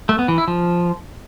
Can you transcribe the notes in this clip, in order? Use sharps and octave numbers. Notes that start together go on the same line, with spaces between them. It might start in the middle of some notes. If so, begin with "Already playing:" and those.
A3
B3
E3
E4
F3